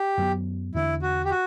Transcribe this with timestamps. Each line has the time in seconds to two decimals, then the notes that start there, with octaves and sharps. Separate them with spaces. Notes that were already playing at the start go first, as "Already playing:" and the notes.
Already playing: G4
0.18 F#2 F#3 B3
0.74 E2 D3 A3 D4 E4
1.02 F#4
1.25 G4
1.31 F#4